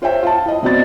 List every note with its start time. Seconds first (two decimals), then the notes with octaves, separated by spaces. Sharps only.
0.02 F4 C5 C#5 E5 G5
0.23 F4 A5
0.46 E4 D#5
0.63 B2 C4 F#4 D5 A6